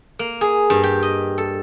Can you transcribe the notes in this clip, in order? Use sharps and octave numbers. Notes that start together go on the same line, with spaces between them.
A#3
G#4
G2
G4
D#5
A4